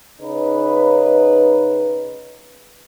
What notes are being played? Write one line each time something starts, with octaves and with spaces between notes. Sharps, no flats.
C#3 D#4 B4